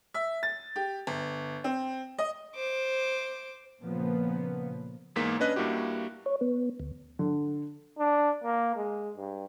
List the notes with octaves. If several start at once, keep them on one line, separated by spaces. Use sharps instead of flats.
E5
A6
G4
G1
C4
D#5
C5 D6
A#2 C#3 F3 A#3 B3
E2 G#2 A#3 B6
C#4 D4 B4 D#5 F#6
G2 A#3 E4 F#4 G4
C#5
B3
D2
D3
D4
A#3
G#3
G2